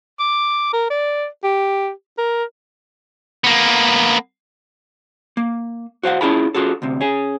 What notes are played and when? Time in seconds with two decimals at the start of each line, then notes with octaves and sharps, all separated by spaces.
0.20 D6
0.73 A#4
0.90 D5
1.44 G4
2.18 A#4
3.44 A#3 B3
5.37 A#3
6.03 F#4 C5 F5 F#5
6.21 C#4 E4 F4 G#4 A5 B5
6.54 C#4 F4 F#4 G#4 A4
6.82 D2 C3
7.01 C#4 G#4